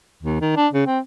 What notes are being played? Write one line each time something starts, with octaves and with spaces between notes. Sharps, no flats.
D#2
D#3
D4
C#3
C4